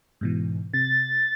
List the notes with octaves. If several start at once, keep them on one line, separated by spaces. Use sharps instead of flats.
G#2 B2 E3
C3 A6